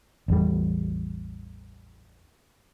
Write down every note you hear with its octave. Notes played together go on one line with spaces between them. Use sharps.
A1 E2 G3